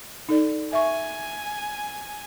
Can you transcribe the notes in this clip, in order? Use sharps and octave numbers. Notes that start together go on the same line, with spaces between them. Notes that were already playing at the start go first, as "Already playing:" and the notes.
D#4 A4 D5
E5 G#5 C#6